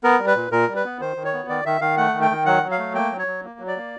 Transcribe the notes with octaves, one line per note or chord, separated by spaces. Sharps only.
B3 A#4
G3
B4
A#2
A#2 A#4
G3
B4
B3
D#3 C5
D#3
C#5
B3
D#3 D5
D#3 E5
D#3 F5
A3 F#5
D#3
G5
D#3
F#3 F#5
F#3
F5
A3
A#3 G5
F#3
C#5
F#3
A#3
F#3
D5
A#3